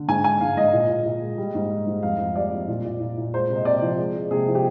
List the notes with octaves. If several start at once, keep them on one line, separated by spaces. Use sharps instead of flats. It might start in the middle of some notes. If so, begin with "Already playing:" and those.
Already playing: D3
G#2 G#5
G#3 G#5
G#2 F5
G#2 D#5
A#2
A#2
A#2
G#3
G3
G#2
G3
G#2
F2 F5
F2
G3 D5
F2
A#2
A#2
A#2
A#2
G#3 C5
C3
D#5
C3 D5
F3
G#3
G#3
C3 G#4
F3
G4